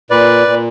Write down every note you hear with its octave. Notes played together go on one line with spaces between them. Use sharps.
A#2 B4 D5
A#2